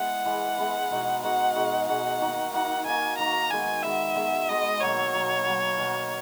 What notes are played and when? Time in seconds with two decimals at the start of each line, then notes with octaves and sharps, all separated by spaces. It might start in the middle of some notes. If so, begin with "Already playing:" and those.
Already playing: G#3 B3 E4 F#5
0.25 E3 G#3 B3 E4
0.58 E3 G#3 B3 E4
0.91 B2 G#3 D#4 F#4
1.23 B2 G#3 D#4 F#4 F#5
1.55 B2 G#3 D#4 F#4
1.88 B2 G#3 D#4 F#4 F#5
2.21 D#3 A#3 D#4 F#4
2.53 D#3 A#3 D#4 F#4 F#5
2.86 D#3 A#3 D#4 F#4 G#5
3.18 D#3 A#3 D#4 F#4 A#5
3.50 D#3 G#3 B3 F#4 G#5
3.83 D#3 G#3 B3 F#4 E5
4.15 D#3 G#3 B3 F#4
4.49 D#3 G#3 B3 F#4 D#5
4.81 B2 F#3 A#3 C#5
5.14 B2 F#3 A#3
5.46 B2 F#3 A#3
5.78 B2 F#3 A#3